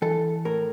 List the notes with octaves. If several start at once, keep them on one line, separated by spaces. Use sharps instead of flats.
E3 A4
A2 A#4